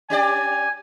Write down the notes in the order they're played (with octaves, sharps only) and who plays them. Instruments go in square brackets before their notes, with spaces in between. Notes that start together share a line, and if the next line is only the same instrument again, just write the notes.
[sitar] C#4 G4 D5 [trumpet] G#5